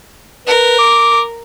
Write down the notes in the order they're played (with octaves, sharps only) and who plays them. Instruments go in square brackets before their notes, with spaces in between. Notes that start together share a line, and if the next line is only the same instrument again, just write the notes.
[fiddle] A#4 [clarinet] B4
[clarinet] D6